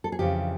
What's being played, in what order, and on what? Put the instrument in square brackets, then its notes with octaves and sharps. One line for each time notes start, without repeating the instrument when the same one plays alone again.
[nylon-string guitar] A4
G#4
F2 C#3 E3 G4